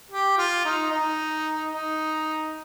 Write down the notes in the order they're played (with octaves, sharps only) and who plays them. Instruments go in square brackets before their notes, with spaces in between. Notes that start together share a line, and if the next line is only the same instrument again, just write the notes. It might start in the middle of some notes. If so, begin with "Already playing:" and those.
[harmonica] G4
F4
D#4
D#4
D#4